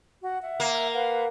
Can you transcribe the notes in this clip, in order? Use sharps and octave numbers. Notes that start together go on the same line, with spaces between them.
F#4 F#5
E5 F#5
A#3
B4 F5 F#5